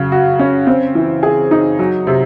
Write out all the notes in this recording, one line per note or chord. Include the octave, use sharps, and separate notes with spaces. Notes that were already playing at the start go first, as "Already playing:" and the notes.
Already playing: C#3 F#3
F#4
C#4
C4
E3
G#4
D#4
F#3
C3